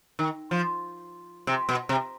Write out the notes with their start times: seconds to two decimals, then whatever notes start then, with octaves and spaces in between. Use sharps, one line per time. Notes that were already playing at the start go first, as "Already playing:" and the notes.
0.19 D#3
0.51 F3
1.47 C3
1.69 B2
1.89 C3